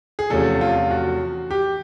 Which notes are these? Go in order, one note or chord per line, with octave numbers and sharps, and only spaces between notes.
G#4
E2 C3 F3 A3 C#4 A4
F4
F#4
G4